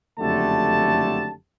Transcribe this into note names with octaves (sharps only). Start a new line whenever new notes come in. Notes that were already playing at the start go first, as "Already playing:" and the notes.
F#1 F2 D3 A3 G4 A5